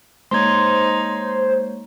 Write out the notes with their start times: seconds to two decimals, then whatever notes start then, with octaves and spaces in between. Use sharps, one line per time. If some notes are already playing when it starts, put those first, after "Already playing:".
0.31 G#3 A#3 D#4 C5 C#5 C6 G#6